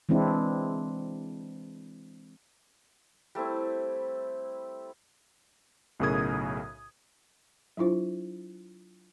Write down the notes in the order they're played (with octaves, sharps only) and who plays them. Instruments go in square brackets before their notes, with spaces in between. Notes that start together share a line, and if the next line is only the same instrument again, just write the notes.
[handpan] E3 G#3 C4 D4 E4
[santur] G3 A3 C4 E4
[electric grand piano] B1 A2 C#3 A#4 D#6 G#6
[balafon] F#3 D4 E4 F4 C5